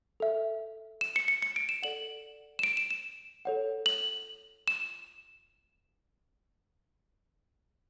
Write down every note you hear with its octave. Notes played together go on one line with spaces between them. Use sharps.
A4 E5
E7
C#7
C#7
C#7
D7
E7
A4 D5 F#5 F#7
E7
D7
E7
E7
A4 C#5 F#5
F#7
E7